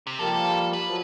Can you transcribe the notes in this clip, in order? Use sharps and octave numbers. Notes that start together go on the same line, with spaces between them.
C3
F3 G3 A#3 A4
B4
F3 F#3